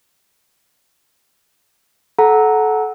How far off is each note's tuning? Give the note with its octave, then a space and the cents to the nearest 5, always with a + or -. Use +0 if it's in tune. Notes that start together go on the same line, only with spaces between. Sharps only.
A4 -25 F#5 +0 A#5 +0